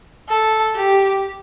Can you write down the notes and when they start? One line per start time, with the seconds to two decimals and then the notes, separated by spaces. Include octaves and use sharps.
0.29 A4
0.76 G4